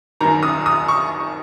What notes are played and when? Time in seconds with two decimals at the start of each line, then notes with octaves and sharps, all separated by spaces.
0.21 F#2 D#3 A#5
0.43 D#6
0.66 D#6
0.88 C#6